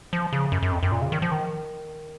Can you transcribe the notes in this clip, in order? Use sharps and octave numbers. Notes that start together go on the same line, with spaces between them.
F3
C#3
F#2
F#2
F2
F#2
A#2
C#3
D#3
F3
D#3